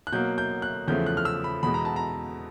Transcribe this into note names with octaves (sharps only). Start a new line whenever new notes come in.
F#6
B2 F#3 A#3 G6
G6
F#6
E2 C#3 F3 A3 G6
F#6
F6
E6
B5
E2 B2 G#3 B5
A#5
A5
A#5